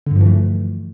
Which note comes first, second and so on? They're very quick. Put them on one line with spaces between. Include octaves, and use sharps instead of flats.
D3 G2 F3 E3 A3